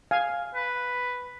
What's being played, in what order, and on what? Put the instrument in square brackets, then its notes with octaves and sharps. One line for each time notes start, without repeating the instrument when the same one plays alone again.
[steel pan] F5 G#5
[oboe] B4